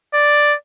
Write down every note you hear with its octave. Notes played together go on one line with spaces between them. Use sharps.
D5